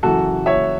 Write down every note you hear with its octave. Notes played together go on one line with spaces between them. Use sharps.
F#2 C#3 E3 F#4 A4
C#5 E5